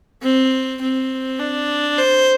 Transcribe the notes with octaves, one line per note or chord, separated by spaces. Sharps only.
C4
C4
D4
C5